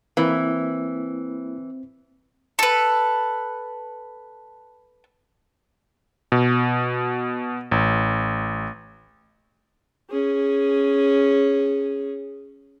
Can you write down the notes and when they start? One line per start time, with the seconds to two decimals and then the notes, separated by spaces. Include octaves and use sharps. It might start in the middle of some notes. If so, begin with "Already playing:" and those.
0.17 E3 A#3 C4 E4
2.59 A4 B4
6.32 B2
7.71 A1
10.09 C#4 G#4